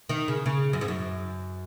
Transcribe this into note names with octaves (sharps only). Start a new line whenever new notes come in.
D#3
C#3
C#3
F#2
G#2
F#2